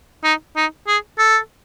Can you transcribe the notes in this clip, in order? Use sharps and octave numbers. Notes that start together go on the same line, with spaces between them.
D#4
D#4
G#4
A4